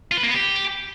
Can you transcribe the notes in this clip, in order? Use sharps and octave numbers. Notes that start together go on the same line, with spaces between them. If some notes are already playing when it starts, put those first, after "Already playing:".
F4
B4
A#3
B3
G4